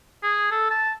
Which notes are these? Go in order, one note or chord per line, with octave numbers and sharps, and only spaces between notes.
G#4
A4
A5